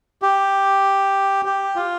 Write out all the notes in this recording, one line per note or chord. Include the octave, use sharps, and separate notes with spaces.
G4
G4
F4